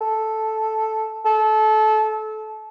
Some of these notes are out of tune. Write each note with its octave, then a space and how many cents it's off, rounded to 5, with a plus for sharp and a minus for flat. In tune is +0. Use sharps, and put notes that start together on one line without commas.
A4 -5
A4 -25